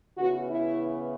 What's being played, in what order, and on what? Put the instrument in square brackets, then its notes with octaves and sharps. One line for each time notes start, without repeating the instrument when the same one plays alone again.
[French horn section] C#3 E3 B3 F#4
E4